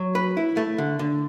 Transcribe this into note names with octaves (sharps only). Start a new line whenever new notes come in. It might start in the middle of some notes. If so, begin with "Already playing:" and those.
Already playing: F#3
B4
E4
A3
D3
D3